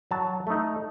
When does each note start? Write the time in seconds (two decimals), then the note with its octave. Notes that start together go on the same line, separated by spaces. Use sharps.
0.11 F#3 A5
0.47 A3 D#4